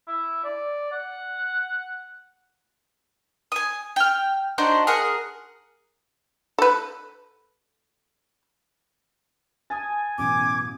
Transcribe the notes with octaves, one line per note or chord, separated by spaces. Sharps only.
E4
D5
F#5
G#5 D#6
G5 F6
D4 D#4 F#4 C5
G#4 A#4 F#5
A4 B4
G#5 A5 D#6 A6
A1 F#2 B2 D6 G#6